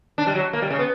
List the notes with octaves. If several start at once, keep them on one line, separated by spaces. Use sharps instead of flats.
D4
G3
F#3
A#3
G3
C#3
B3